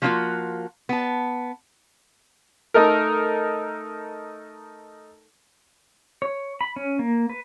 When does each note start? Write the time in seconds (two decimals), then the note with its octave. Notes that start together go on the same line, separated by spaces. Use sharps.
0.02 F3 A3 A#3 C4 F4 F#4
0.89 B3 A5
2.74 A3 D#4 A4 A#4
6.22 C#5
6.61 B5
6.76 C#4
6.99 A#3
7.29 B4